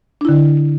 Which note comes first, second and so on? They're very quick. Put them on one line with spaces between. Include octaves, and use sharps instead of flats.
D4 E4 D3